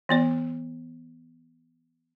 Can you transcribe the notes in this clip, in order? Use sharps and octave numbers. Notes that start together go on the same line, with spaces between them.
E3 B3 D5